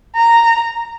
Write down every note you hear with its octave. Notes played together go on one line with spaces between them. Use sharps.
A#5